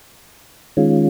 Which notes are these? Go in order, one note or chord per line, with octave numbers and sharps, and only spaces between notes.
D#3 G#3 C#4 F4